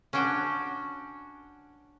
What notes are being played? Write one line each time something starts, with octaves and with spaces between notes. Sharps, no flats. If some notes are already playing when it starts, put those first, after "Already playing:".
C#4 D4 F#4 G5